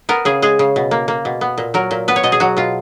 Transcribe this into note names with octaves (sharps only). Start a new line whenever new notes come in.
B3 A#4
C#3 G#4
G#3 G#4
C#3
B2
A#3
A#3
B2
B3
A#2
F#3 A#4
A#2
B3 B4
C#5
B2 D#5
G#4
F#3 F#4
B2 F4